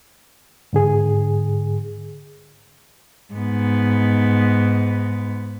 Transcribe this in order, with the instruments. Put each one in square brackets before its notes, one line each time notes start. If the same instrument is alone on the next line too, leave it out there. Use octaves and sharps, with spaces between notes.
[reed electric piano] G#2 D3 G#4
[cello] G#2 B3